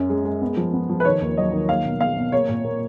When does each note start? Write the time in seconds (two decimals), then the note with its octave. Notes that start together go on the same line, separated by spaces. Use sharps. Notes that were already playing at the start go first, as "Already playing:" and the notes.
Already playing: F#2 C#4
0.10 G#3
0.25 G#3
0.42 B3
0.57 F3
0.74 B3
0.89 F3
1.00 B4
1.05 D#3 C#5
1.21 D#2
1.37 F#3 D#5
1.53 D#3
1.69 A#3 F5
1.85 B2
2.01 B2 F5
2.17 B2
2.32 A#3 C#5
2.49 A#2
2.65 A#3